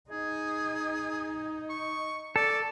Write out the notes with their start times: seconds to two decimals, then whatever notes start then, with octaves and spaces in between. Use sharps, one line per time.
0.10 D#4 G#4
1.70 C#6
2.36 A4 D5